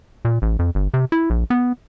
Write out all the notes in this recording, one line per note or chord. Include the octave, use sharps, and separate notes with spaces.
A#2
A1
F2
G1
C3
E4
A#1
B3